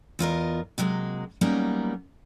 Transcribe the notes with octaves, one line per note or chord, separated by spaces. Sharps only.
E2 F4 A#4 D#5
C3 F#3 G#3 A#3
F#3 G3 A#3 B3 C#4 D#4